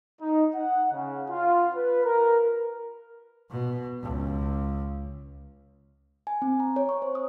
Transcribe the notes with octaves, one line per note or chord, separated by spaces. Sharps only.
D#4
F#5
C#3
F4
B4
A#4
B2
C#2
G#5
C4
A#5
C#5
C#6
C5
D#6